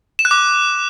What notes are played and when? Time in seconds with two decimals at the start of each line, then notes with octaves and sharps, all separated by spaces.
0.19 E7
0.25 F#6
0.31 D6